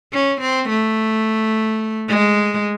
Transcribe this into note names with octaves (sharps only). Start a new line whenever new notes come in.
C#4
C4
A3
G#3